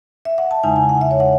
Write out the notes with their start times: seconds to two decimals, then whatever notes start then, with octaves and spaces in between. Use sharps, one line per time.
0.25 E5
0.38 F#5
0.51 A5
0.63 E2 C#3 G#3 D#4 G#5
0.76 G#5
0.89 F#5
1.01 E5
1.11 C#5
1.20 F#5